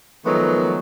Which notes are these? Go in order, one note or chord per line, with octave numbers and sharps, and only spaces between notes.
D#3 F3 F#3 G#3 A3 B3